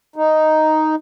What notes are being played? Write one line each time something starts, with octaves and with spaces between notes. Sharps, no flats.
D#4